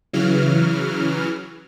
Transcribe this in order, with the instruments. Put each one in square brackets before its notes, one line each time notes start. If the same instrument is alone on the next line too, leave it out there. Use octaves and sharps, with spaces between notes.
[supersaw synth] C#3 E3 F#3 F6